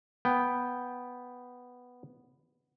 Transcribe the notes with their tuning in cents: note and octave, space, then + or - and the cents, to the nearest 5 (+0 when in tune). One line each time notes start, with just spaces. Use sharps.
B3 +0 G5 +0